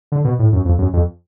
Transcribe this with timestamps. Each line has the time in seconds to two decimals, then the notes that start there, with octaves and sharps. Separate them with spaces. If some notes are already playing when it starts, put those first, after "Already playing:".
0.12 D3
0.25 B2
0.39 A2
0.53 F#2
0.65 F2
0.79 F#2
0.93 F2